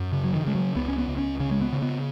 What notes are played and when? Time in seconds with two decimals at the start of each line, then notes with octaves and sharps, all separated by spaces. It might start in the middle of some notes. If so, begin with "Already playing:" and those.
Already playing: F#2
0.12 C#3
0.24 F#3
0.33 D#3
0.45 C#3 G#3
0.55 F#3
0.76 C#2 B3
0.88 C#4
0.98 B3
1.08 C#2
1.18 C#4
1.40 C#3 C#4
1.51 G#3
1.62 B3
1.72 C#3
1.82 B3